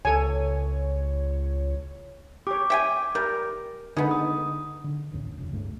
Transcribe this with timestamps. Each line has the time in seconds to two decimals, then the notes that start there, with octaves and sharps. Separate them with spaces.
0.05 C#2 A4 C#5 G#5
2.47 G4 C#5 D6
2.70 E5 G5 G#5
3.15 G3 A#4
3.97 D3 G#3 B3 D#4
4.11 D#6
4.84 D3
5.13 A1 D#2 C#4
5.37 F1 C#3
5.53 D1 G2 A3